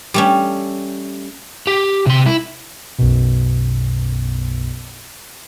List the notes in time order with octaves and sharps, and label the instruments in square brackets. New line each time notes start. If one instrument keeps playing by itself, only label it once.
[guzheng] G3 A3 C#4
[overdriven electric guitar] G4
C3 C6
E4
[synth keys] B1 F#2 B2